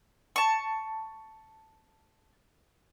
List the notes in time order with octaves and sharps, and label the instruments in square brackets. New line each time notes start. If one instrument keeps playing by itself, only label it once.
[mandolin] A5 C#6